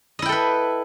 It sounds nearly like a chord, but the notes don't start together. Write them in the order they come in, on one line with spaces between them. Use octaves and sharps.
D#5 E4 G5 A4 B4